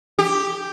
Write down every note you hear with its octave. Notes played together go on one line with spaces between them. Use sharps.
G4